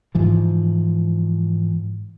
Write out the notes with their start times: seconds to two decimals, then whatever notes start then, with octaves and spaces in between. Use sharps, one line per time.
0.15 G#2 E3 F3